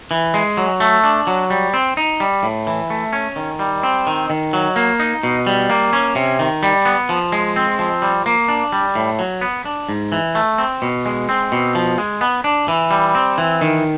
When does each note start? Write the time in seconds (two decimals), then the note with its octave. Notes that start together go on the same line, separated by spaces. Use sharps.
0.11 E3
0.34 G#3
0.57 F#3
0.80 A3
1.04 D4
1.27 F#3
1.50 G3
1.74 C4
1.97 D#4
2.20 G3
2.43 A2
2.67 E3
2.90 A3
3.13 C#4
3.36 D#3
3.59 G3
3.83 C4
4.07 D#3
4.30 D#3
4.53 F#3
4.76 A#3
5.00 D#4
5.23 B2
5.47 G3
5.70 A#3
5.93 C#4
6.15 C3
6.39 D#3
6.63 G3
6.85 B3
7.09 F3
7.32 G#3
7.56 C4
7.79 F3
8.02 G3
8.26 A#3
8.48 D4
8.72 G3
8.95 A2
9.19 F#3
9.41 B3
9.65 D4
9.89 G#2
10.12 E3
10.35 A3
10.58 C4
10.82 B2
11.06 G#3
11.29 C4
11.52 B2
11.75 F3
11.98 G#3
12.21 B3
12.44 D4
12.68 E3
12.91 G3
13.15 C4
13.38 E3
13.61 D#3